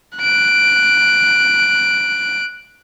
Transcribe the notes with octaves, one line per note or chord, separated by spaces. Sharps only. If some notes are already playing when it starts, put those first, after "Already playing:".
F#6 D7